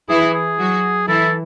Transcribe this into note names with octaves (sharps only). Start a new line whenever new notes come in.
E3 E4 G#4
G#4
F#3 F#4
E3 E4 A4